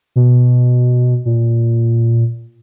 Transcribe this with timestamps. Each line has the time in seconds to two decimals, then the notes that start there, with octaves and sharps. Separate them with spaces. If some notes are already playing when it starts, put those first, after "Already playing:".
0.16 B2
1.25 A#2